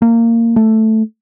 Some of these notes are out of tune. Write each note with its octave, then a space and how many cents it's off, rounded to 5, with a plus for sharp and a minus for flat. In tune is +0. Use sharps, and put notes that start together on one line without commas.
A#3 -20
A3 +0